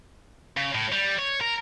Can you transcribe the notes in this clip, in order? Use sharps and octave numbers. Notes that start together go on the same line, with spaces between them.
C#3
A2
G3
C#5
A#4